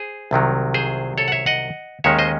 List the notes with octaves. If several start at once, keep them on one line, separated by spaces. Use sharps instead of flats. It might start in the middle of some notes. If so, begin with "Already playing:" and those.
Already playing: G#4 C5
C2 C3 D#3 F#3
G#4 C5
A4 C#5
F#5
C#5 E5
D#5 F#5
D#2 D#3 G#3 C#4 C#5 E5
C5 D#5